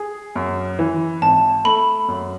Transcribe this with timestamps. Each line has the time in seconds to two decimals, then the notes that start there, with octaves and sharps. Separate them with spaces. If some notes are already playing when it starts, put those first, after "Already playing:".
Already playing: G#4
0.36 F#2
0.79 E3
1.22 G#1 A5
1.65 A3 B5
2.08 F#2